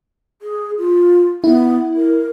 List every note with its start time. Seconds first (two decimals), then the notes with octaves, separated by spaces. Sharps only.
0.42 G#4
0.78 F4
1.44 B3 E4
1.96 A#4